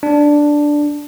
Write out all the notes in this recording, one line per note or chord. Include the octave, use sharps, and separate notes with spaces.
D4